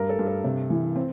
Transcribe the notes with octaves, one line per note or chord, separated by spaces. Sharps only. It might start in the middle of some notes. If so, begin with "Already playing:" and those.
Already playing: G2 A#4
A4
G2
A4
C3
E3
C4